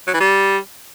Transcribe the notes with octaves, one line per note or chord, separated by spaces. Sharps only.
F#3
E3
G3